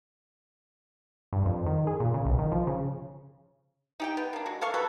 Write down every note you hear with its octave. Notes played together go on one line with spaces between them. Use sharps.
G2
F2
D#3
G#4
A#2
C#3
B1
D#3
F3
C#3
D#4 G4 G5
B3
A#3 D4
G#3 F#4
A#3 A4 F5 C#6
F#3 G3 A4 B4